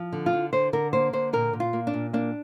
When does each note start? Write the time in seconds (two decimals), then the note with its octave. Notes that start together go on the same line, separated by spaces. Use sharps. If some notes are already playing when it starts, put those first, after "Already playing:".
Already playing: F3
0.12 D3
0.26 F4
0.33 D3
0.53 D3 C5
0.73 D3 A#4
0.93 A#3 C5
1.13 D3 C5
1.33 A#2 A#4
1.53 A#2
1.60 F4
1.73 A#3
1.87 D4
1.94 A#2
2.13 A#3 D4